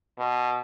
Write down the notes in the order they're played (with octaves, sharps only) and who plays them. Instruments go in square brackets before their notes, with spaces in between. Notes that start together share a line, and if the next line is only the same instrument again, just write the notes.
[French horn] B2